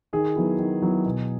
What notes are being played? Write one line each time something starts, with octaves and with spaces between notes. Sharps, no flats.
D#3 G#4
F#3 B3 E4
D#3
F#3 B3 E4
B2